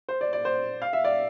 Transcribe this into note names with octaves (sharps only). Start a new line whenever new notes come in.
C5
D5
D5
C5
F5
E5
D5